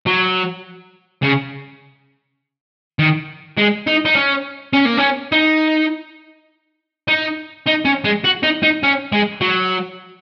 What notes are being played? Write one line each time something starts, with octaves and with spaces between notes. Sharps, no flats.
F#3
C#3
D#3
G#3
D#4
D#4
C#4
C#4
A#3
C#4
D#4
D#4
D#4
C#4
G#3
F#4
D#4
D#4
C#4
G#3
F#3